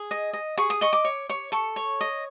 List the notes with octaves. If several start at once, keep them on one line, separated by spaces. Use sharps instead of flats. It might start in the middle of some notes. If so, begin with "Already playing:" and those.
Already playing: G#4
D#5
D#5
G#4 C#6
D#6
D#5 C#6
D6
C#5
C#5
A4 C#6
C#5
D#5